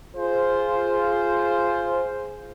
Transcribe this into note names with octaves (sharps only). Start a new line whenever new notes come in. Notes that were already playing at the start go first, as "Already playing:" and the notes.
F4 G#4 C5